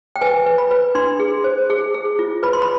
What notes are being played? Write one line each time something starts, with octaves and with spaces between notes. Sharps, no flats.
G5
B4 G#5
B4
B5
B4
D4 C6
G#4
C5
G#4
G#4
F4
B4 B5
C6
B5